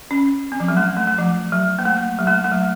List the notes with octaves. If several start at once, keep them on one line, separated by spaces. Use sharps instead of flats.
C#4
C4
F3
F#3
A3
A3
A3
F3
F#3
A#3
A3
F#3
A3
A3
F#3